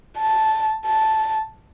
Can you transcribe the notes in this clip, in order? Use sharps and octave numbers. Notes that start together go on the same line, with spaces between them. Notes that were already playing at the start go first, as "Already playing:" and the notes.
A5
A5